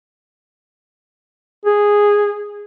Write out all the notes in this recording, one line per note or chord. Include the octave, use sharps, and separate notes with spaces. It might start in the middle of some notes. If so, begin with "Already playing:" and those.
G#4